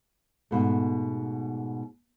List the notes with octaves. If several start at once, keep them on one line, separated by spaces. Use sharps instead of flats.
G#2 B2 A3